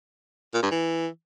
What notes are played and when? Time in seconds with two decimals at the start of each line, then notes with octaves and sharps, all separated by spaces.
0.54 A#2
0.62 G2
0.71 E3